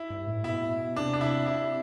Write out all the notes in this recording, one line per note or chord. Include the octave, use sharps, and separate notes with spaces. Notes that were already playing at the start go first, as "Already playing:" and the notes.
Already playing: E4
G2
A2
B2 E4
C3 D4
D4
E4
E4